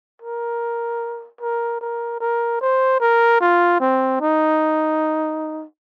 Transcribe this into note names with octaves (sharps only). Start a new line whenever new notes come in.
A#4
A#4
A#4
A#4
C5
A#4
F4
C4
D#4